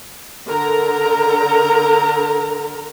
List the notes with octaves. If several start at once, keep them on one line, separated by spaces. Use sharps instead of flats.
D3 A#4 A#5